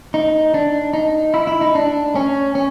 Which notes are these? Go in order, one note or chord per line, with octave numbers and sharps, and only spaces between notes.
D#4
D4
D#4
E4
E4
D#4
D4
C#4
C#4